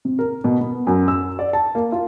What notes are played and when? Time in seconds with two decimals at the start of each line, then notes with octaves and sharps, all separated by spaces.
0.05 C3
0.19 A#4
0.44 B2
0.60 B3
0.87 F#2
1.08 E6
1.39 D5
1.53 A5
1.75 A#3
1.92 F4